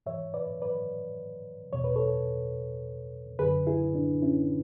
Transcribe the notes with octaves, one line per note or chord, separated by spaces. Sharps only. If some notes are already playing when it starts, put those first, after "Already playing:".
G#2 E3 C#5 E5
B4 D5
B4 D5
E2 B2 C#5
B4
A4 C#5
F#2 D3 G#4 B4
E4 G#4
D4
C#4 E4